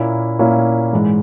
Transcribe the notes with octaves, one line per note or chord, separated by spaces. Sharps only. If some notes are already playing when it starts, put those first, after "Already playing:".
Already playing: A#2 A#3 C#4 E4
A#2 A#3 C#4 E4
G#2 E3 G#3